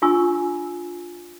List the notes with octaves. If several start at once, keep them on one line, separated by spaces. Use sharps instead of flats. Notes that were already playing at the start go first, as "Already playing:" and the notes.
D4 F4 G#5 C#6 E6